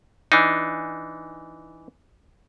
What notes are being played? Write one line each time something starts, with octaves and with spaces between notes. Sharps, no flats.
E3 D4 D#4